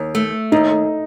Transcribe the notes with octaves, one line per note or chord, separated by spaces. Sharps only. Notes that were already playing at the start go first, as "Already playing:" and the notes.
Already playing: D#2
A3
D#2 D#4